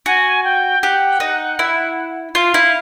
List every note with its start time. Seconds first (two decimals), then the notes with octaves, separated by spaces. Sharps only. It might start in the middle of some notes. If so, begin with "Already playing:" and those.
0.06 F#4 G#5
0.44 G5
0.83 G4 F#5
1.20 D#4
1.59 E4
2.35 F4 F5
2.54 E4